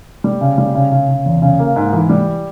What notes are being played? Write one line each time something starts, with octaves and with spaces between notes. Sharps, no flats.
G3
C#3
G3
C#3
C#3
C#3
E2
C#3
A#3
G#2
E3
G3